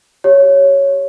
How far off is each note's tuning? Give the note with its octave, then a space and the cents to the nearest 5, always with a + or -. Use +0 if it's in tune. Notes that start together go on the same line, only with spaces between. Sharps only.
G4 +0 C#5 +0